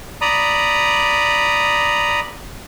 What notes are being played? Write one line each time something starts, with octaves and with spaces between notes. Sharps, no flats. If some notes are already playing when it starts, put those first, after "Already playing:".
D5 A#5 B5 D#6